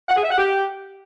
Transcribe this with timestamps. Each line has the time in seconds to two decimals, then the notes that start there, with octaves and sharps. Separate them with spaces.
0.09 F#5
0.16 G#4
0.24 E5
0.31 F#5
0.38 G4